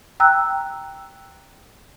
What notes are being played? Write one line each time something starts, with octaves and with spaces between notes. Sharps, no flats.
G5 A#5 E6 F#6